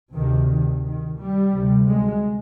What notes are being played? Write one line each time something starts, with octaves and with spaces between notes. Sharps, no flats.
D2 C3 D#3
D#3
D#3
G3
D2 C3
G#3